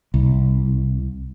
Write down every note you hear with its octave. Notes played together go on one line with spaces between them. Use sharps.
C2